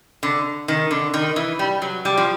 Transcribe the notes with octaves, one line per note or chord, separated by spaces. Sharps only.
D3
D#3
D3
D#3
E3
G3
F#3
G3
F3